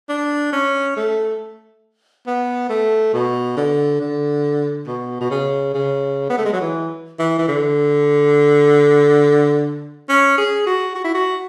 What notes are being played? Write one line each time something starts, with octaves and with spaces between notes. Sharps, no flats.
D4
C#4
A3
B3
A3
B2
D3
D3
B2
B2
C#3
C#3
B3
A3
G#3
F#3
E3
E3
E3
D3
C#4
G#4
F#4
F#4
E4
F#4